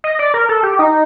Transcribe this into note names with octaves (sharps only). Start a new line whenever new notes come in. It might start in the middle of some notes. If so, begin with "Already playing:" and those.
D#5
D5
A#4
A4
G4
D#4